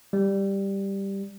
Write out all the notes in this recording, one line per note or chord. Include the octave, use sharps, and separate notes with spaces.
G3